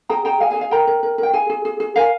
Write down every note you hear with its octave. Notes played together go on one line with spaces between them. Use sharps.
G#4 G5 A#5
G#4 G5 A#5
G#4 F5 G#5
F5 G#5
G#4
F5 G#5
A#4 G5 A#5
A#4
A#4
A#4 G5
G#4 F5 G#5
G#4
G#4
G#4
A#4 F5 G#5